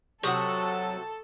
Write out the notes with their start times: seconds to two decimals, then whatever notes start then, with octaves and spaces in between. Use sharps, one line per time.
0.23 C3 F#3 F#4 A4 C#6 D#6